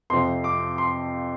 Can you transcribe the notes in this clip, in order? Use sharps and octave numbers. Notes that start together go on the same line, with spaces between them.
F2 C3 F3 C6
D6
C6